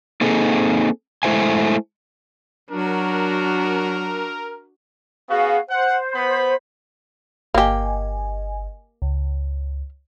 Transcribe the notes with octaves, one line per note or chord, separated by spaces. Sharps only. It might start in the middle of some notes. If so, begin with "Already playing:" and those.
A#3 C4 D#4 G#4 A4
G#3 A3 E4 C5 F5 G#5
F#3 D4 F#4 A#4
B3 C#4 F#4 G#4 F5
C5 F#5
B3 B5
G1 A#3 G4 D#5 G#5
C#2